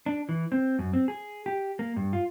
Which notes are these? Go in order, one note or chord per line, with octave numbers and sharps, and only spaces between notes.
D4
E3
C4
F#2
C4
G#4
G4
A#3
G2
F4